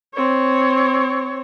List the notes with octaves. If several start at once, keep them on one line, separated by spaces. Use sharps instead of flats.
C4 C#5